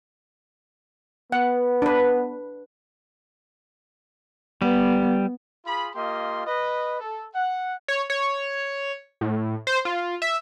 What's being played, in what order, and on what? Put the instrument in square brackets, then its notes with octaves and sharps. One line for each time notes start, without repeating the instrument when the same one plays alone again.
[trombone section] B3 [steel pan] F#5
[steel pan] D4 B4
[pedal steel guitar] G3 [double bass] B3
[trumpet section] F4 G#4 B5
A#3 F4 G4 D#5 C6
B4 D#5
A4
F#5
[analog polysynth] C#5
C#5
A2
C5
F4
E5